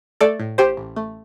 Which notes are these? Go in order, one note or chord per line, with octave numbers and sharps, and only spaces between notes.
A3 A4 D5
A2
A1 G4 C5
A1
A3